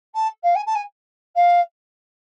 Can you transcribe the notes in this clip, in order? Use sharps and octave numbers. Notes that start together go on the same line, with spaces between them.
A5
F5
G#5
A5
G#5
F5